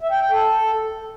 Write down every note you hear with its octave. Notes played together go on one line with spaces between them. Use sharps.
E5
G5
G5
A4